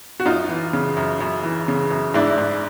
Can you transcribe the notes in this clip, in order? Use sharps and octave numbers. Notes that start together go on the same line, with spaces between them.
F#4
F#2 D#4 F4
E3
C#3
F#2
F#2
E3
C#3
F#2
G#2 D4 E4
G#2